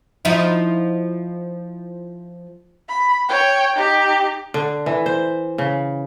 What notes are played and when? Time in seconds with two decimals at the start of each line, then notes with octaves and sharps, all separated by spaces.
0.25 F3 D#4 E4
2.88 B5
3.29 C#5 G5
3.76 D#4 G4
4.54 D3
4.86 E3
5.06 C5
5.58 C#3